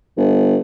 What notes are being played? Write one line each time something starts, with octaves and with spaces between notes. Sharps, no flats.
G1